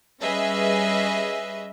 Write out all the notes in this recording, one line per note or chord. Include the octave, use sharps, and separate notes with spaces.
G3 C#4 G#4 B4 D#5 E5